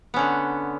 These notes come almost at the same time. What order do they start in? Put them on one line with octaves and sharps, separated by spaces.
B3 C#4 D3